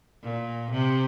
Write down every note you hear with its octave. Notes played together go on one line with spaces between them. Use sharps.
A#2
C3